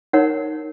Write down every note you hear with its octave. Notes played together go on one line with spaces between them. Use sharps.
D#4 A#4 C#5 F#5